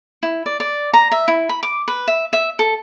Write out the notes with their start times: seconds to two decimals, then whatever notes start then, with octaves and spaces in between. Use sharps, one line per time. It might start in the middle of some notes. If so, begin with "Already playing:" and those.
0.23 E4
0.46 D5
0.60 D5
0.93 A#5
1.12 E5
1.28 E4
1.49 B5
1.63 D6
1.88 B4
2.08 E5
2.33 E5
2.59 A4